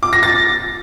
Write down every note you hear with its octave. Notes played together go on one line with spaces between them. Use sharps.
D6
A#6
A6